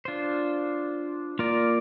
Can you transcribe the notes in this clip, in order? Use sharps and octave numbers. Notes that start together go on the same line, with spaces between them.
D4 F4 C5
A#3 F4 A#4 D5